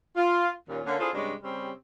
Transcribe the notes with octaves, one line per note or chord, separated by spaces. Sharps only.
F4
D#2 A#2 C#4
D3 A#3 C#4
D4 E4 F4 G#4 A4 C5
G2 C3 G#3 C#4 D4
C#3 G3 C4 C#4 G4